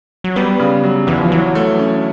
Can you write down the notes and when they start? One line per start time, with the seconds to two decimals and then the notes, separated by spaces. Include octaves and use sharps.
0.24 F#3
0.36 G3 B3
0.60 C#3
0.84 F#3
1.07 E2 E3
1.19 F3
1.31 E3 F#3
1.55 A3
1.79 C#4